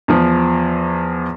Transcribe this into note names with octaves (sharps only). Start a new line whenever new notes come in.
E2 F3